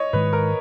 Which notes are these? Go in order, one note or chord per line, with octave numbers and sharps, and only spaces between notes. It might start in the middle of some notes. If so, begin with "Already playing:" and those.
Already playing: C#5 D#5
G#2 D#3 G#3 B4
A#4